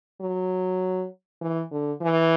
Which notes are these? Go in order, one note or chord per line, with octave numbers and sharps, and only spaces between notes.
F#3
E3
D3
E3